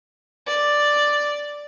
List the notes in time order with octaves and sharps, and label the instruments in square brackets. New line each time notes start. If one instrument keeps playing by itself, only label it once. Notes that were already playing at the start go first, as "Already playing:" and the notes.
[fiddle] D5